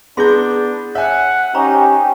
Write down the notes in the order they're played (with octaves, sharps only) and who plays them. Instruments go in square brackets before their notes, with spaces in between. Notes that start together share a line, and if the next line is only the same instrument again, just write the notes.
[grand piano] B3 G6 [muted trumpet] D4 [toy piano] E4 G#4 C6
[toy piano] C#5 [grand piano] E5 G#5 [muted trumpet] F#5
[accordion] C#4 G4 [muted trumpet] D#4 [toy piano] C5 A#5 C#6